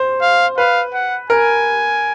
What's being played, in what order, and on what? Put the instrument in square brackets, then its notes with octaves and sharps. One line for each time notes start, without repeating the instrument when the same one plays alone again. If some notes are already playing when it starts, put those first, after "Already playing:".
Already playing: [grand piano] C5
[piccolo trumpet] F5
[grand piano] B4 [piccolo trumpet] F5
[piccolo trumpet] F#5
[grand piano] A#4 [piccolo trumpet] G#5